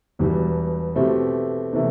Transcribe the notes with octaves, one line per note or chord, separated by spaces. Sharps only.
E1 E2 B2 G3
B2 A3 C4 E4 G4
C3 E3 A3